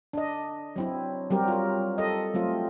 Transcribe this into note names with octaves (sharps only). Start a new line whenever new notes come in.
D4 D#5
F#3 C4 E4
F#3 G3 C4 G4 A#4
F4 A#4
A4 D#5
F#3 A3 C4 F4